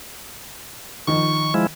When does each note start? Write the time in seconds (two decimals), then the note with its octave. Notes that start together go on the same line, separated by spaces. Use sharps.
1.07 D#3 F3 C#6
1.54 F3 G#3 E4